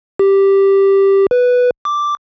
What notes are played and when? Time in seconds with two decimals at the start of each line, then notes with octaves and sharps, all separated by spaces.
0.19 G4
1.31 B4
1.85 D6